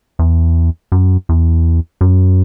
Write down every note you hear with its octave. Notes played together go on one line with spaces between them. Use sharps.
E2
F#2
E2
F#2